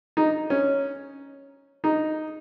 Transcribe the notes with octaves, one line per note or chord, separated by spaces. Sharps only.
D#4
C#4
D#4